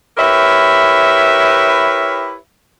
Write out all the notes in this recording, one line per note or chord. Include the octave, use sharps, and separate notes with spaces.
E4 G4 A#4 B4 C#5 E5